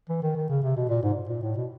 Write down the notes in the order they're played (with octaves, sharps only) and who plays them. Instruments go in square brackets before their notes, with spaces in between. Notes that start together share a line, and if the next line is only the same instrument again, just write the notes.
[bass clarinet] E3
D#3
D#3
C#3
C3
B2
A#2
G#2
A#2
A2
B2